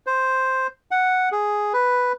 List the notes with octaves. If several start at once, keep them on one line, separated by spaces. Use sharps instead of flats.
C5
F#5
G#4
B4